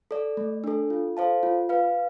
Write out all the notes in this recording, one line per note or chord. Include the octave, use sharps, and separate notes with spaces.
A4 D5
A3
D4 A4
F4
A4 C5 F5 A5
F4
B4 F5